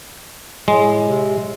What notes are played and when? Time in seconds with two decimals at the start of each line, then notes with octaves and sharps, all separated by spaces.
0.68 A2 G#3
1.08 C3